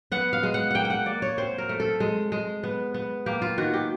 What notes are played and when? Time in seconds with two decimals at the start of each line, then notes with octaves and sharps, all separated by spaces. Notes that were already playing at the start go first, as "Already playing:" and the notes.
0.12 B3 F#5
0.33 F5
0.43 G#3
0.54 F#5
0.71 A#3 F#5 G5
0.85 G5
0.90 F#5
1.06 A#3 D5
1.22 C#5
1.38 C4 C5
1.58 A#4
1.69 A3
1.80 A4
2.00 G#3
2.32 G#3
2.63 B3
2.94 B3
3.26 A#3 G4
3.42 F4
3.58 D#3 F#4
3.73 G4